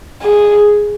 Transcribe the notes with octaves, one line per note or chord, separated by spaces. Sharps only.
G#4